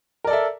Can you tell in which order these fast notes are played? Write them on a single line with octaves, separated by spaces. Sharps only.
A#4 D5 A4 E5